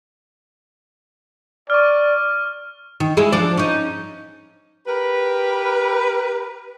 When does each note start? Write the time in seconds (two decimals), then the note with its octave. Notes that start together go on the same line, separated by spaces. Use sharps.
1.70 D5 C#6 F6
3.00 D#3
3.17 G#3 E4 G#4
3.32 F3 D4 D5
3.57 C#4 D#4
4.87 G4 A#4 B4